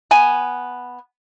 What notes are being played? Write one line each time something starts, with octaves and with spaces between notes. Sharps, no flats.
B3 G#5